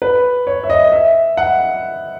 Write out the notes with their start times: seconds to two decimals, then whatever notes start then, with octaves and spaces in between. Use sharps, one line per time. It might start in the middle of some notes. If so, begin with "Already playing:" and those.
0.02 B4
0.47 C#5
0.64 E5
0.70 D#5
0.92 E5
1.37 F#5